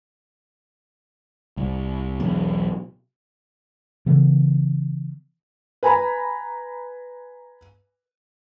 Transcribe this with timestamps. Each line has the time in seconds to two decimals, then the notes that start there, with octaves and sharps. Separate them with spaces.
1.57 C2
2.20 B1 E2
4.06 C#3 E3 B3
5.83 B4 G#5 A#5 B5